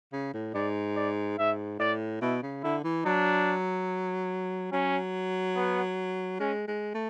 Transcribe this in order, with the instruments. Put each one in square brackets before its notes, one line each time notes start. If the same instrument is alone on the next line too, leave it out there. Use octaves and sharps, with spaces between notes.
[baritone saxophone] C#3
A2
[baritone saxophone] G#2 [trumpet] D5
[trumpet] D5
[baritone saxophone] G#2 [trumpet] E5
[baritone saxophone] A2 [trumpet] D5
[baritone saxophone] B2 [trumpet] E4
[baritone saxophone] C#3
[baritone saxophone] D3 [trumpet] E4
[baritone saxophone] E3
[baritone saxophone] F#3 [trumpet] D4
[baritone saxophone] F#3 [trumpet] C#4
[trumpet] B3
[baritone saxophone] G#3 [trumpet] C#4
[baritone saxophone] G#3
A3